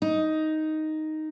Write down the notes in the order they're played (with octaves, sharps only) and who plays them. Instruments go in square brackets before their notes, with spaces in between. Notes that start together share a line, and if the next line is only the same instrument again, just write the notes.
[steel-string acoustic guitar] D#4